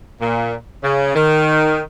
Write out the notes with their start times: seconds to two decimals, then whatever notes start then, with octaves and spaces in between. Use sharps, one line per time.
0.22 A#2
0.83 C#3
1.15 D#3